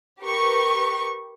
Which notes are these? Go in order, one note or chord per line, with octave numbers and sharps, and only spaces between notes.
G4 A#4 B4 C#6